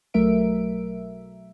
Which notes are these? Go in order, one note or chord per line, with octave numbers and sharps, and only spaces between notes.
B1 F#3 A3 A#4 E5 D7